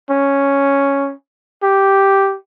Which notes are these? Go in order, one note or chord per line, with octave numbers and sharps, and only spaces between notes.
C#4
G4